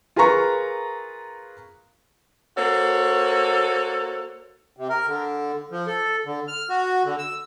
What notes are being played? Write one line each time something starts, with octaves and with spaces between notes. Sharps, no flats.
F4 G#4 A#4 B4 A#5 C#6
A#3 F#4 A4 C5 C#5
C3
A#4
D3
F3
A4
D3
F6
F#4
D3
E6